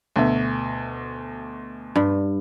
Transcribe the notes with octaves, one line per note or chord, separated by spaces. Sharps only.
D2 B2 E5
G2